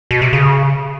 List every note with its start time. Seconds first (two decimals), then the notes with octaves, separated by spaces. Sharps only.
0.11 B2
0.22 C3
0.33 C#3